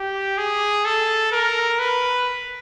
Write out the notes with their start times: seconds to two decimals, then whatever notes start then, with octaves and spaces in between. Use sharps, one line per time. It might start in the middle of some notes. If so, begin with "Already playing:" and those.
Already playing: G4
0.38 G#4
0.85 A4
1.32 A#4
1.79 B4